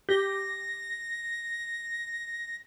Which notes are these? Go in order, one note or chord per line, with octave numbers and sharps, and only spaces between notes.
G4 A#6